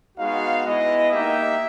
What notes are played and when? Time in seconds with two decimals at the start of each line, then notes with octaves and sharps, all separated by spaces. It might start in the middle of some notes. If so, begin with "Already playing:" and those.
0.17 G#3 B3 D#4 F#4 F5
0.64 G#3 B3 E4 D#5
1.12 A#3 D#4 G4 E5